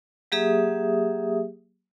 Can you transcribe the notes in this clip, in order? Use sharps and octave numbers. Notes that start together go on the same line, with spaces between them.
F#3 A#3 G4 G#4 E5 D#6